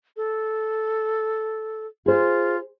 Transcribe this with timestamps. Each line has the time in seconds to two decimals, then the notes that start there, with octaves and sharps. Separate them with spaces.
0.17 A4
2.06 F4 G#4 C5